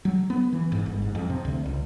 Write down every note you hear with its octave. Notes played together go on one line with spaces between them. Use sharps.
F#3
B3
E3
G#2
G1
G#2
F2
C3
D2
C#2